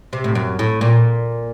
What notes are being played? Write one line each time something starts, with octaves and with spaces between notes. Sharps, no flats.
C3
A2
F#2
A2
A#2